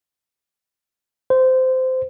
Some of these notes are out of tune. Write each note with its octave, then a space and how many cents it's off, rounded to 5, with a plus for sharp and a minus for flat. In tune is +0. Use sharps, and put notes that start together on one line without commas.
C5 -15